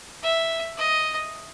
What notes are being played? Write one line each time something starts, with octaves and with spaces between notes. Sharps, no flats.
E5
D#5